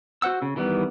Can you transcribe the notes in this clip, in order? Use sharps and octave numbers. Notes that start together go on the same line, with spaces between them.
F#4 C5 F#5 E6
C#3
D#3 E3 G3 B3